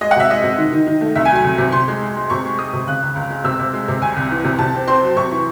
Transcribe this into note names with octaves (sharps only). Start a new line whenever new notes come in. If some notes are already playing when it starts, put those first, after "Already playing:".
G#3 D#5
F#5
C3 E5
G#3 D#5
C3
D#3
D#3
D#3
A3
C2 E5
G#5
F#3
G#5
C2
C3
C3 C6
G#3
G#3
G#3
C3 C#6
G#3
G#3 D#6
C3
C#3 F#6
C#2
C#2
G#3
C3 E6
C3
G#3
C3
C2 G#5
C2
E3
C3
C3 A5
C4
C4 C6
F#3
C3 C#6
E3